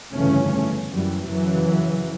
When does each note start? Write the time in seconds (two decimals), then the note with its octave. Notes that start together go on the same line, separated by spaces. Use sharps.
0.12 G1 F2 C#3 E3 A3 C#4
0.92 F#2 E3 G3
1.29 F#2 C#3 E3 F#3